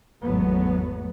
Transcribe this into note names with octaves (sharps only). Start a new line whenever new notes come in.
G#1 E2 G#2 F#3 A3 B3